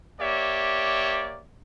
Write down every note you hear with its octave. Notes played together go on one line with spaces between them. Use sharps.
A#3 G4 C#5 D5 E5